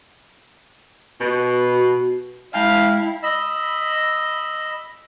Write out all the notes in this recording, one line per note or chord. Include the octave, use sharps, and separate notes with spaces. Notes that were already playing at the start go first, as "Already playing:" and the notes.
B2 F#4
G#3 E4 F5 G5 A5
D#5 B5 E6